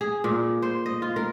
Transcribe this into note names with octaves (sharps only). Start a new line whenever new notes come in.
G#4
A#2
C5
D#5
F4
A#4